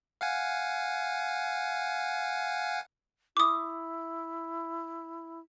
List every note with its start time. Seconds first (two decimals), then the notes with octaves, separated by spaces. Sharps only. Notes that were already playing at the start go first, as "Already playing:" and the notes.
0.21 F5 F#5 G#5
3.37 E4 D6 D#6